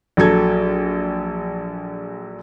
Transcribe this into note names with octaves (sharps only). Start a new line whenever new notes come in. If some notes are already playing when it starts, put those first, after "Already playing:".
A#1 F#3 A4 G#6